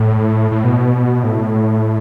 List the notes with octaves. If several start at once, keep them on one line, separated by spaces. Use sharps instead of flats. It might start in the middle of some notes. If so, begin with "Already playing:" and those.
Already playing: A2
A2
B2
A2